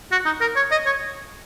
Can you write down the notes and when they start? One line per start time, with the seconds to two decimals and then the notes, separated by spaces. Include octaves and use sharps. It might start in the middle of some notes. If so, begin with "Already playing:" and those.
0.12 F#4
0.26 D#4
0.41 A#4
0.56 C#5
0.72 D#5
0.86 C#5